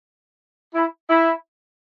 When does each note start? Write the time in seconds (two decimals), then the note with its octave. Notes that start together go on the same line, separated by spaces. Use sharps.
0.74 E4
1.10 E4